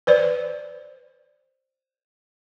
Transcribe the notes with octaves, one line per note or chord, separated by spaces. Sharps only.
B4 C5 D5